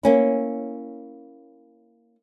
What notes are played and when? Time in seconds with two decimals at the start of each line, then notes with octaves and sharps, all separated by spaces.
0.03 A#3 C#4 E4